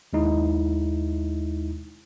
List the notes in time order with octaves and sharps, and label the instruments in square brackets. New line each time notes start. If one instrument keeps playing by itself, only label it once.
[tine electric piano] D#2 G#3 D#4 E4